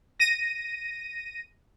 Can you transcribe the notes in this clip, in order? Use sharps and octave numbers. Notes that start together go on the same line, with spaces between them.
A#6 D#7